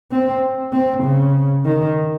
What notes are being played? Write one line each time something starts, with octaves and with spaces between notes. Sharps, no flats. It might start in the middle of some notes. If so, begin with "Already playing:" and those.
C4
C4
C#3
D#3